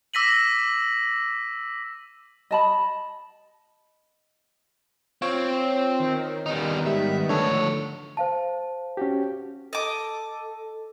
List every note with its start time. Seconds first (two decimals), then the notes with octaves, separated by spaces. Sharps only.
0.14 D6 E6 A#6 B6 D#7 F#7
2.51 D#5 A5 B5
5.22 C4 F4 C#5
6.00 D#3
6.46 D#3 G3 B3 D#4
6.86 G#2 G3 E5
7.29 D3 F3 A3 A4 C#5
8.17 C5 F5 A5
8.97 C#4 F#4 G4
9.73 A4 D#5 D6